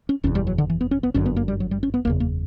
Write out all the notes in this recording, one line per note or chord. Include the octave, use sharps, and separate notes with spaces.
C#4
F#1 E2 B2 C#4
G3
F#3
D3
E3
B3
C#4
B3
G1 F#2 D3 C#4
B3
A#3
G3
F#3
G3
C#4
B3
F#1 E2 C#3 A#3
A#3